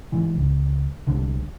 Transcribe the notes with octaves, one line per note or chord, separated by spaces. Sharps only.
G#2 E3
C#2
C2 D3